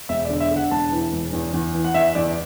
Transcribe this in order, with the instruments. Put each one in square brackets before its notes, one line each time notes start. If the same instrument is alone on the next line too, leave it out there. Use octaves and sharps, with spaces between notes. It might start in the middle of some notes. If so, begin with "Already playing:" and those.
[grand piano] E1 E5
D5
D3
E5
D3 F#5
E1 A5
E3
E1
E2
E2
E3
F#5
E2 E5
E2 D5